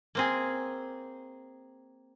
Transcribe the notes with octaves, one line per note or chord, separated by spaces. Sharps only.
A#3 C4 G#4